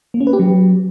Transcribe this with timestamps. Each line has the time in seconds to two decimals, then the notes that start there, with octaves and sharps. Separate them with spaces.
0.14 A#3
0.21 C#4
0.27 B4
0.33 G4
0.39 F#3